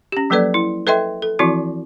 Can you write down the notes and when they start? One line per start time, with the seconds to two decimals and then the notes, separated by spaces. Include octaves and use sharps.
0.12 C#4 G4
0.30 F3 F#3 A#3 A4 B4 D5
0.54 E4
0.87 A4 B4 D#5 E5 G5 C6
1.22 A4
1.39 E3 F3 C4 E4 F#4